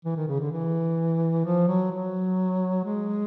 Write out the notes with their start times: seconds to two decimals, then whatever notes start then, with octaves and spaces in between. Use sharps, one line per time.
0.05 E3
0.17 D#3
0.28 C#3
0.40 D3
0.52 E3
1.45 F3
1.68 F#3
1.92 F#3
2.85 G#3